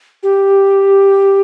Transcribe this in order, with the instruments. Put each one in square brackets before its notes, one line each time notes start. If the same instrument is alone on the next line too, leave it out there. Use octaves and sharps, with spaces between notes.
[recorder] G4